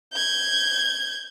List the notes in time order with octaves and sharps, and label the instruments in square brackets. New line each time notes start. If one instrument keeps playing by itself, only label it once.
[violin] G6 G#6